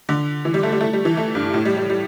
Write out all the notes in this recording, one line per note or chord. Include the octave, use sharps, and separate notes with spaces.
D3
E3
G3
A3
G3
A3
G3
E3
A3
G2
A2
G3
G3
G3